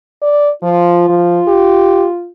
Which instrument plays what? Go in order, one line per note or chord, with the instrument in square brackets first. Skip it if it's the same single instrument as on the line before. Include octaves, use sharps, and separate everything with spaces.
[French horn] D5
[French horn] F3 [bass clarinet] F4
[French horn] F3
G4